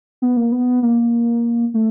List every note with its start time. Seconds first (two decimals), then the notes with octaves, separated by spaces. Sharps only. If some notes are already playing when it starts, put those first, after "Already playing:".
0.22 B3
0.37 A#3
0.52 B3
0.83 A#3
1.74 A3